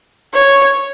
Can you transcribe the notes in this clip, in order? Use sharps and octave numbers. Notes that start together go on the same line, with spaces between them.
C#5